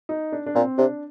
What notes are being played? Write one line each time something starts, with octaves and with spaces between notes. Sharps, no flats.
D#4
D4
D4
A#2 C4
C3 D4